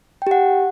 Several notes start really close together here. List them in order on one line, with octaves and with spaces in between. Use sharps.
G5 G4 F#5